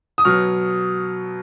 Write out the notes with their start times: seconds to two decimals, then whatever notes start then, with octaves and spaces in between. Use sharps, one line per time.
0.18 D#6
0.25 B2 F#3 C#6 F6